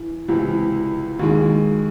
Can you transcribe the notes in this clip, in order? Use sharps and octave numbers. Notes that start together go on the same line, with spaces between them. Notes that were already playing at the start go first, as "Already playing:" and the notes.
Already playing: E3
C#2 C3 E3
D#2 D#3 G#3